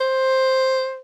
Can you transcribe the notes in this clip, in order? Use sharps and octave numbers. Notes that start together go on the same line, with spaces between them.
C5